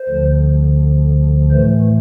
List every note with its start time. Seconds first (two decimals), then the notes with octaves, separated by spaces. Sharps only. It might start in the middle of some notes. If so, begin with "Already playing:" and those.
Already playing: C5
0.09 D2 D3 F3
1.51 A2 E3 A3 C5